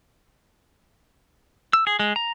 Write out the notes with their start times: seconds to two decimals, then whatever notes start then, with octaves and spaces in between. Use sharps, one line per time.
1.73 E6
1.87 G#4
1.99 G#3
2.16 A#5